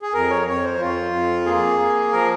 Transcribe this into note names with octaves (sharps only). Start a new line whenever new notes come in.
G#4
F2 A#4
C#5
F2 C#5
C5
F2 F4
F2
A#3 G#4
A#3
F3 A#4